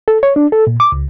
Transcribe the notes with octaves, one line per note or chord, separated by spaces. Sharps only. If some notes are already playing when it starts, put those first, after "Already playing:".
A4
C#5
D4
A4
A#2
D6
C#2